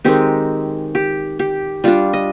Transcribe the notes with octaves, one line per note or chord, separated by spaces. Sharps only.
D#3 G#3 C4 D#4 G4
G4
G4
G3 D4 F4
D#5